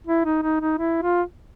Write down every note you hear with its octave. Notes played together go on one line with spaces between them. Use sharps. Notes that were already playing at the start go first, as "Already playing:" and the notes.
E4
D#4
D#4
D#4
E4
F4